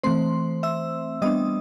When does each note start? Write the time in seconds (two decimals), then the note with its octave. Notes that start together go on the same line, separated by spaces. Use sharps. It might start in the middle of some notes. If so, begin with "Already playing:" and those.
0.04 E3 A3 C4 C5 C6
0.63 E5 E6
1.22 G3 B3 D4 D#5 D#6